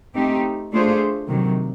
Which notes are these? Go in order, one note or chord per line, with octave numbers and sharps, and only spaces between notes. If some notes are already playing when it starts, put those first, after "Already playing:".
A3 C4 D#4 G4
A3 D4 F4 G#4 C5
C3 D#3 F#3